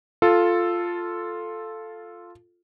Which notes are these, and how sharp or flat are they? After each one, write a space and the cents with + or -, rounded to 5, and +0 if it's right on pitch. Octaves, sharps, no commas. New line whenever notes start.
F4 +0 A4 +0